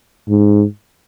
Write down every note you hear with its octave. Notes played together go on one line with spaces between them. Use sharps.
G#2